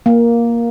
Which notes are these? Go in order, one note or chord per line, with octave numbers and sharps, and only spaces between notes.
A#3